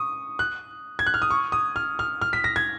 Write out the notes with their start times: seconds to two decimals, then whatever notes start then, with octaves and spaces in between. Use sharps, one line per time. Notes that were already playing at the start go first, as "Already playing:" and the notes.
Already playing: C#6 D#6
0.39 F#6
0.99 G#6
1.06 F#6
1.14 F6
1.22 D#6
1.31 C#6
1.52 D#6
1.76 F6
1.99 F6
2.22 F6
2.33 B6
2.44 A#6
2.56 G#6